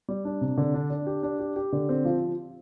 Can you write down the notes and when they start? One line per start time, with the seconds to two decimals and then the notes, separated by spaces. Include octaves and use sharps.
0.09 G3
0.25 D4
0.41 C3
0.57 D3
0.74 D4
0.90 D4
1.07 G4
1.23 D4
1.39 G4
1.56 G4
1.72 D3
1.89 C4
2.05 F3